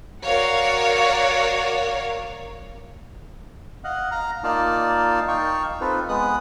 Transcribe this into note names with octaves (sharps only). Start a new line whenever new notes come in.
F#4 A#4 C#5 D5 F5
D#5 F5 F#5
F5 A#5
A#3 D#4 F4 D5 F5 A5
D#4 F5 G5 C#6
C4 D#4 F4 A4 B4
G#3 B3 D#6 F#6